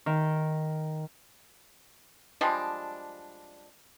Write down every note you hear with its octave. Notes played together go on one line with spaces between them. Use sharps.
D#3
F3 G3 G#3 D4